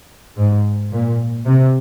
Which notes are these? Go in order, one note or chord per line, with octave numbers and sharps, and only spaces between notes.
G#2
A#2
C3